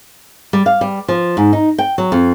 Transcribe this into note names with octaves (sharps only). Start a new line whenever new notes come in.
G3
F5
G3
F3
G#2
D#4
G5
F#3
F2